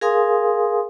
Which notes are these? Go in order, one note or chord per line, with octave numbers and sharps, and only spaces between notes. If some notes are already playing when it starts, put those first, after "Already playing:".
G#4 A#4 F5 G#5 C6 D#6